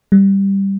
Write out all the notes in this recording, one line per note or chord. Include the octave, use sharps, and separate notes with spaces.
G3